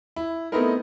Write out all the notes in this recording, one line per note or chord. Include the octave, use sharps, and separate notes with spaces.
E4
A3 B3 C4 D#4 E4 A#4